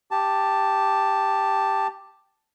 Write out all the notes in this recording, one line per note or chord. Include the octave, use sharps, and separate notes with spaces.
G4 A5